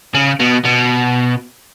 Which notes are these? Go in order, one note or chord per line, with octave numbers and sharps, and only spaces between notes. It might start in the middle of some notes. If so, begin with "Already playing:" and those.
C#3
B2
B2